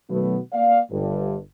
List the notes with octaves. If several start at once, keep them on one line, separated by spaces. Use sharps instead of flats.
B2 D#3 F#3 A3 B3
A#3 D5 F5
G1 G2